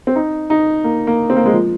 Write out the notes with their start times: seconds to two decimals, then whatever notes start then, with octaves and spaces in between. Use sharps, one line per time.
0.07 C4
0.15 D#4
0.50 D#4
0.84 A#3
1.07 A#3
1.30 C4
1.36 A#3
1.46 G#3
1.53 F3